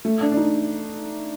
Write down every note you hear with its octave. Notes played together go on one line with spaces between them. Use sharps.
A3
D4
D4
D#4